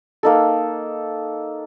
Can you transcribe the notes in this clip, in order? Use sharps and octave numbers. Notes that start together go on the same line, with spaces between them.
A#3 D#4 A4